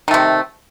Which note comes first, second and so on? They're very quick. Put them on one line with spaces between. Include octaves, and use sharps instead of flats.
D#3 A3 C3